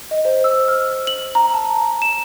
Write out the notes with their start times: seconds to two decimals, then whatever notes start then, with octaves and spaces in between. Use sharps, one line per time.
0.11 D#5
0.25 C5
0.44 E6
0.68 F6
1.07 F#7
1.35 A#5
1.54 A5
2.02 E7